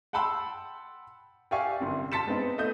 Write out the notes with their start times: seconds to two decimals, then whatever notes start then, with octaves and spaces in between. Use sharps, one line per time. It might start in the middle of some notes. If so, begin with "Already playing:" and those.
0.13 F#5 G5 A5 B5 C6 E6
1.51 G4 D5 E5 F5 G#5 C#6
1.80 G1 F#2 C3
2.12 A5 C6 A6 B6 C#7 E7
2.27 G#3 B3 C4 D#4
2.58 A3 B3 D#5 D#6 G6